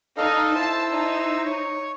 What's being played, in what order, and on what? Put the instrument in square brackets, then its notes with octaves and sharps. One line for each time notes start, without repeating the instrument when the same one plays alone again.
[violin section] D#4 [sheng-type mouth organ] A4 D#5 F5
[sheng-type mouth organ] E4 C5 E6 [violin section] A5
[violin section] D#4
[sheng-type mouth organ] C#5